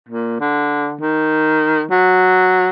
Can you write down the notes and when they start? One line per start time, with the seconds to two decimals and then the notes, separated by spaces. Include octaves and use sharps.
0.09 A#2
0.40 D3
1.01 D#3
1.91 F#3